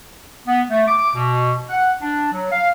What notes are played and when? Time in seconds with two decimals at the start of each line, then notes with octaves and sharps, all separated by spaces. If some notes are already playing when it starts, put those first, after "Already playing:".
0.47 B3
0.70 A3
0.88 D6
1.15 B2
1.69 F#5
2.02 D4
2.32 F#3
2.52 F5